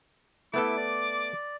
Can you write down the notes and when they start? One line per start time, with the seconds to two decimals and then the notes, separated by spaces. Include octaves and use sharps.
0.54 A3 B3 E4 A4 D6
0.77 D5